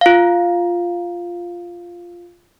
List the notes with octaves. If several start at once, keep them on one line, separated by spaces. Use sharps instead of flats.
F4 F5